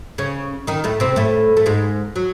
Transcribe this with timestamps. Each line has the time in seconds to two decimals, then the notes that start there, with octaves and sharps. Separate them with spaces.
0.18 C#3 C#4
0.67 D#3 D#4
0.84 A2 A3
1.00 C3 C4
1.16 A2 A3
1.57 A3
1.66 G#2 G#3
2.16 F#3